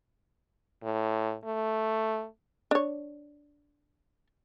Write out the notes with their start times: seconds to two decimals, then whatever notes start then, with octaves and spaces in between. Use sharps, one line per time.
0.83 A2
1.45 A3
2.71 D4 C#5